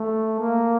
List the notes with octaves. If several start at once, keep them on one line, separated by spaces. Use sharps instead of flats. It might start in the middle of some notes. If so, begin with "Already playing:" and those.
Already playing: A3
A#3